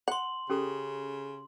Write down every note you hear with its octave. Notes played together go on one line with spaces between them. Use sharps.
F#5 C6 F#7
C#3 C#4 G4 A4